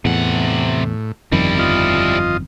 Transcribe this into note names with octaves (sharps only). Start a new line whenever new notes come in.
E2 A2 C3 F#5
G1 F2 D#3 G3 E4
F3 F4 D#5